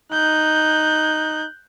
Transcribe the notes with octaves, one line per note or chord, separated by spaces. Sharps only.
D#4 F#6 G6